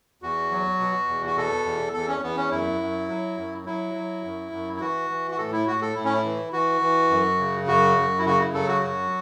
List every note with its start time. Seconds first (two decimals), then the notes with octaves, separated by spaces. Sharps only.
0.22 E2 F#4
0.51 F#3
0.80 B2
1.08 E2
1.26 F#4
1.36 B2 A4
1.65 E2
1.93 E2 A4
2.08 C#4
2.22 E2 B3
2.37 C#4
2.51 F#2 E4
2.81 F#2
3.09 F#3
3.38 F#2
3.66 F#3 E4
3.94 F#3
4.24 F#2
4.52 F#2
4.76 E4
4.80 E3 F#4
5.10 E3
5.31 F#4
5.38 A2 A4
5.52 E4
5.67 A2 F#4
5.82 A4
5.95 A2 E4
6.05 C#4
6.13 E4
6.25 E3
6.53 E3 F#4
6.81 E3
7.10 F#2
7.39 C#3
7.67 F#2 F#4
7.97 F#2
8.19 E4
8.25 C#3 F#4
8.40 E4
8.54 F#3 A4
8.68 F#4
8.83 F#2 F#4